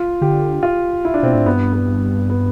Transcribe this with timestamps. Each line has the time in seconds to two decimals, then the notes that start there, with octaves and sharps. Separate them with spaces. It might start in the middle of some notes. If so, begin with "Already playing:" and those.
Already playing: F4
0.21 D3 G4
0.63 F4
1.05 E4
1.14 D4
1.23 B2 C4
1.33 A2 D4
1.46 G2 B3
1.73 B3
2.30 B3